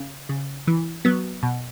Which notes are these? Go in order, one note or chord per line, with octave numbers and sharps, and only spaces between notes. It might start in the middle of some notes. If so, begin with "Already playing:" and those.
Already playing: C#3
C#3
E3
F#3 B3
B2